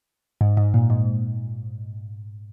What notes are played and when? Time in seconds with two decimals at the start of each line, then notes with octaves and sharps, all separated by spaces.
0.41 G#2
0.57 G#2
0.74 A#2
0.90 G#2